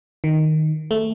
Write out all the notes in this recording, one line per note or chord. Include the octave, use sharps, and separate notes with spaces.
D#3
A3